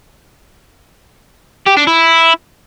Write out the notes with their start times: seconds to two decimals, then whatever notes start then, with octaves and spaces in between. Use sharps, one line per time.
1.66 G4
1.77 D4
1.87 E4